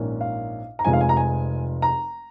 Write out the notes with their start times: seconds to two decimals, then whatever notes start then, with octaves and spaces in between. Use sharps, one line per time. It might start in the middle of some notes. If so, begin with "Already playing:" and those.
Already playing: A#1 G#2 D#3 A#3 C#4
0.21 F5
0.79 A#5
0.85 F1 F2 F3 G#3 G#5
0.93 F5
1.01 G#5
1.09 A#5
1.17 G#5
1.82 A#5